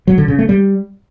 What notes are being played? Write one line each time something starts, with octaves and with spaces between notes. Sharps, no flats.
F#3
D3
C#3
A3
G3